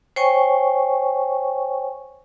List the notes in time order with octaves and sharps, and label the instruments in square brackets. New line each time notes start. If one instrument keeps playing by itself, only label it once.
[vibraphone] C5 C#5 G5 G#5 C#6